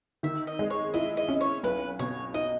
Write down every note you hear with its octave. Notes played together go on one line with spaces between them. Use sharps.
D#3 E5
D#5
G#3
C#5
E4 D#5
D#5
C#4
C#5
B1 B4
B2 C#5
D#4 D#5